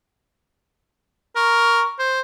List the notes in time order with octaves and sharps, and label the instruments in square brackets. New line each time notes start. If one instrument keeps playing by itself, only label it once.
[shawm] A#4 [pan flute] C#6
[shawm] C5